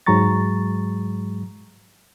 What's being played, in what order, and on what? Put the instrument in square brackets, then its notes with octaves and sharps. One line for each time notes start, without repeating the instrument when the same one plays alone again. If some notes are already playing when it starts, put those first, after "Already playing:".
[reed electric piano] G#2 F#3 G#3 A#5 C#6 A6